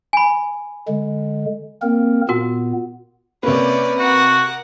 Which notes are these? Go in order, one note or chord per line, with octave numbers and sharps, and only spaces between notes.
G#5 B5
D3 G#3
A#3 C4 A#4
A#2 B3 F#4 A#4
C3 A#3 C#4 B4 D5
F#4 A#4 F#5